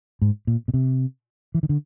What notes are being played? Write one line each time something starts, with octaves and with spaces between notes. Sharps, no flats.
G#2
A#2
B2
C3
E3
D#3
D3